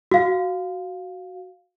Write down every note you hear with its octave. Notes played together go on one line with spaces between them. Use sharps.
F#4 F5